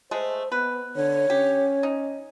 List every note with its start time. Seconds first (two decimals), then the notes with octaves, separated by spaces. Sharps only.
0.11 G#3 A3 C5
0.52 B3 B4
0.96 D3 C#5
1.30 C#4 G4
1.83 D#4